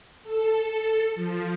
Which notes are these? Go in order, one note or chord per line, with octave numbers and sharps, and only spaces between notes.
A4
F3